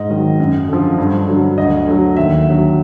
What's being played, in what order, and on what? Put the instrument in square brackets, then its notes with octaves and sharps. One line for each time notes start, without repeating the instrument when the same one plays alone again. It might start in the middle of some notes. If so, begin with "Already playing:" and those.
Already playing: [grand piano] G#2 D#5
D#3 F#3
F#2
D3 F3
G2
D3 F#3
D2 D#5
D3 F#3
D#2 E5
D3 F#3